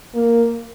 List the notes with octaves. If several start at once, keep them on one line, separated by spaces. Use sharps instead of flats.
A#3